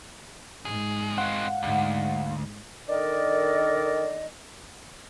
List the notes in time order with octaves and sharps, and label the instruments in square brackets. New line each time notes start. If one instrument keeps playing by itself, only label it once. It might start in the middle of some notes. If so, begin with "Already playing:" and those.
[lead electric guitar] C2 G#4 [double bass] G#2
[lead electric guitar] G#3 C4 [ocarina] F5 [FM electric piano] F#5
[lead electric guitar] D2 [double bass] G#2
[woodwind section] D#3 D4 A4 A#4 D5 D#5